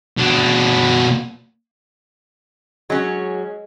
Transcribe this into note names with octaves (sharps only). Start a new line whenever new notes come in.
B2 D4
F#3 G#3 C#4